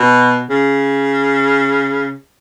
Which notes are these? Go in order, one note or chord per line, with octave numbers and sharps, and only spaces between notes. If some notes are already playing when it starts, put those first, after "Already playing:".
Already playing: B2
C#3